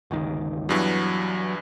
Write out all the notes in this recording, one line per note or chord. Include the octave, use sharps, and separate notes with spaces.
G1 C#2 D#3
E2 G2 E3 F#3